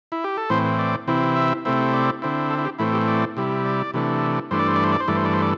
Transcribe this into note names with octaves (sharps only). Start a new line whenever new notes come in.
E4
G4
A4
A2 E3 C4 C5
D5
C3 E3 C4 E4
E5
C3 A3 C4 E4
D5
D3 C4 E4
A4
E4
G4
A2 E3 A3 C4 E4
G4
D5
C3 G3 E4
D5
C3 E3 A3 D4
G2 E3 A3 D4 C5
D5
C5
D5
C5
D5
C5
G2 E3 A3 D5
C5
D5
C5
D5